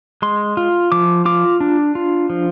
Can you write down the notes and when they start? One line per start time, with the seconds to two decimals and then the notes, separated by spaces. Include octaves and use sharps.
0.22 G#3 C6
0.57 F4
0.92 F3 D6
1.25 F4 D6
1.61 D4
1.95 F4
2.30 F3